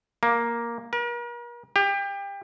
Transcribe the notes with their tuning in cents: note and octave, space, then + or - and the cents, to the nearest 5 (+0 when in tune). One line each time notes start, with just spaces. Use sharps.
A#3 +5
A#4 +40
G4 +25